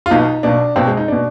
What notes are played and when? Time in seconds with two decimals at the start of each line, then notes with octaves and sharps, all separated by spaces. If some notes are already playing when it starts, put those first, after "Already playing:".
0.06 F4
0.11 B1 B2 D#4
0.43 B1 B2 D4
0.76 B1 B2 C4
0.87 G#3
0.97 D#4
1.08 B2 D4